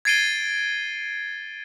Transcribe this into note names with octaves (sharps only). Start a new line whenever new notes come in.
G#6 A6 C7 D7 D#7 G7